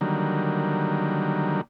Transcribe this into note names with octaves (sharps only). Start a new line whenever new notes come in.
D3 D#3 F#3 G3 A#3